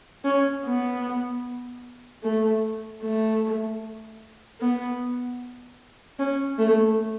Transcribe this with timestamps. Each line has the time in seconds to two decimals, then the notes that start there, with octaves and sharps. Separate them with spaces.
0.24 C#4
0.65 B3
2.23 A3
3.03 A3
4.61 B3
6.19 C#4
6.58 A3